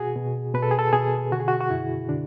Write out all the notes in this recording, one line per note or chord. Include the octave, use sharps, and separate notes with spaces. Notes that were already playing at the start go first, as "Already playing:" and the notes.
Already playing: B2 F#4 G#4
B2
B2 B4
A4
G#4
A4
B2 G#4
D3 F#4
G#4
F#4
F#4
F#2 E4
D3 D4